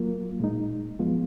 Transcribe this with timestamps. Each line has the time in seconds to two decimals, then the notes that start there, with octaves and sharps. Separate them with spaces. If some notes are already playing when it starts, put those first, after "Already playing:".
Already playing: F#3 A#3 F4
0.40 A#2 G#3 D#4
0.99 F#2 F3 G#3 B3 F4